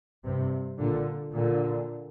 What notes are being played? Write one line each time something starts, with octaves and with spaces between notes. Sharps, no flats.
G2 C3
A#2 D3
A#2 D3